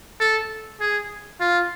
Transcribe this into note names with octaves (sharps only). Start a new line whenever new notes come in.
A4
G#4
F4